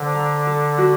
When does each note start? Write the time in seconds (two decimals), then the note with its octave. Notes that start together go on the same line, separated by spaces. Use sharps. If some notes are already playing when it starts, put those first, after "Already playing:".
Already playing: D3 C5
0.14 A#5
0.47 A4
0.78 F#4